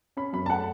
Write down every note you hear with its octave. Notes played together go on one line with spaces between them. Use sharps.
C#4 B5
F#2 B5
A5
A3 F#5